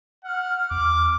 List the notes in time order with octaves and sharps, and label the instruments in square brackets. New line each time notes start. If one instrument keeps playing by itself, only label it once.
[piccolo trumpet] F#5 [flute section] F6
[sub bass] E2 [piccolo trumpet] D6